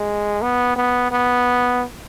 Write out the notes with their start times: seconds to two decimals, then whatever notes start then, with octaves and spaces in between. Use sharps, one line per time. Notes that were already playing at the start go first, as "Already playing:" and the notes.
Already playing: G#3
0.42 B3
0.76 B3
1.12 B3